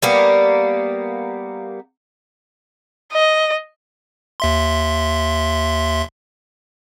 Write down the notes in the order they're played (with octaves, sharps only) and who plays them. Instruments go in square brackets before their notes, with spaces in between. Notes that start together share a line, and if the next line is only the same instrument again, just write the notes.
[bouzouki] G3 A#3 B3
[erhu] D#5
[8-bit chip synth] D#2 E5 C6